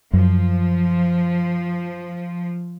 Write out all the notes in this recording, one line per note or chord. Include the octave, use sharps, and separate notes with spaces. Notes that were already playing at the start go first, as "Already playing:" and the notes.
F#2 F3